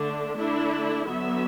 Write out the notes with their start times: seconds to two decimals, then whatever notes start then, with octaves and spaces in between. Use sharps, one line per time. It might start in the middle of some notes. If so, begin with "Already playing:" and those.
Already playing: D3 A3 D4
0.37 D3 A3 D4 E4
1.08 D3 F#3 B3 E5